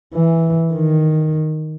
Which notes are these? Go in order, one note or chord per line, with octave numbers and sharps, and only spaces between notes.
E3
D#3